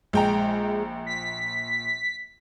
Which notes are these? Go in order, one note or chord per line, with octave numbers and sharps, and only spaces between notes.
A#1 G#3 G5 A#5
B6